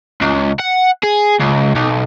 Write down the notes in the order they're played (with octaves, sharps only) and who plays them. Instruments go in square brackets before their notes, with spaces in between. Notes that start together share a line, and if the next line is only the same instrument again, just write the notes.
[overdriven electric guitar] C#2
F#5
G#4
C#2
B1